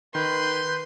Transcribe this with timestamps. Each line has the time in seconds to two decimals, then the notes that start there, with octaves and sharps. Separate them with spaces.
0.15 D#3 B4 C6 G6